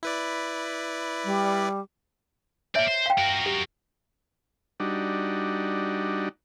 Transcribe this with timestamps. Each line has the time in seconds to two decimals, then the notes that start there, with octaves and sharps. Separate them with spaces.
0.03 E4 B4 D5
1.24 G3
2.75 A#3 C#5 D5 E5
2.88 C5
3.06 F5 G5
3.18 F#4 A#4
3.46 G4
4.80 G3 D4 D#4 F#4